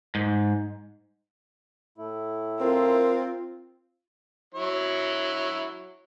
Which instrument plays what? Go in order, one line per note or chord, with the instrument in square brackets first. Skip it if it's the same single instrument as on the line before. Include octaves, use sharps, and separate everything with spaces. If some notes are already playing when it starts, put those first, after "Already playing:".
[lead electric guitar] G#2
[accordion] A2 A3 E4
[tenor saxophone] C4 [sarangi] F4 [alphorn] A#4
[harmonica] F#3 E4 C#5